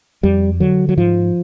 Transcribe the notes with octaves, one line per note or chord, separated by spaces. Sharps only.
F2 G3
D3 F#3
F#3
G#2 F3